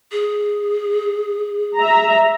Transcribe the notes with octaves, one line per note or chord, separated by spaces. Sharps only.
G#4
E5 A#5